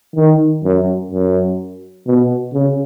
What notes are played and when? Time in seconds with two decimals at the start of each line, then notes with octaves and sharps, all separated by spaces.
0.16 D#3
0.64 F#2
1.12 F#2
2.07 B2
2.53 C#3